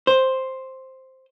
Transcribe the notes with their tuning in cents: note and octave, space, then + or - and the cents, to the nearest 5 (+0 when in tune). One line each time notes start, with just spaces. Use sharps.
C5 +5